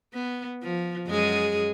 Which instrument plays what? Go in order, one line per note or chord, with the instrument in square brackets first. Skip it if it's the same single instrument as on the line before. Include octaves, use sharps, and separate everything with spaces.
[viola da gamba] B3
F3
F#2 G#3 G#4